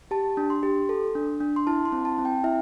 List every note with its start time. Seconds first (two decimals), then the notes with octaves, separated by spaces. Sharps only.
0.11 G4 A5
0.37 D4
0.50 C6
0.63 G4
0.89 A4
1.15 D4
1.40 D4
1.56 C6
1.67 E4 A5
1.85 C6
1.92 C4
2.05 A5
2.19 C4
2.25 G5
2.44 E4 E5